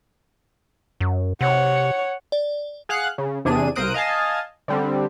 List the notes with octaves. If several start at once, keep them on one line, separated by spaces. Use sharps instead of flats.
F#2
C3 C#5 F#5
D5
G#4 F5 F#5 F#6
C#3
E2 C3 D4 G#4 D#7
C2 A#4 C5 D#6 F#6 D7
D#5 F5 G#5 A5
D3 G3 C4